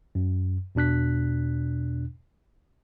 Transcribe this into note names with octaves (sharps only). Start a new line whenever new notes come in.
F#2
E2 B2 D4 F#6 B6